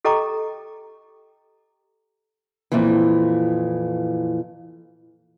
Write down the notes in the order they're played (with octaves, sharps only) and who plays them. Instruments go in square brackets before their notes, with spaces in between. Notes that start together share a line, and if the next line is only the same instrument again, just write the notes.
[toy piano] G4 A4 D#5 G5 A#5 D6
[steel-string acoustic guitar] F2 A#2 E3